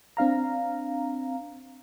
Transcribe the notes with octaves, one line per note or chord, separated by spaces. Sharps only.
C4 D4 F5 A#5